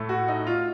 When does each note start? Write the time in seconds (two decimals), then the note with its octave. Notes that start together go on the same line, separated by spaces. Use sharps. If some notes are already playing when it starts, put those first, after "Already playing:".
Already playing: A2 A3
0.09 F#4
0.28 D#4
0.47 F4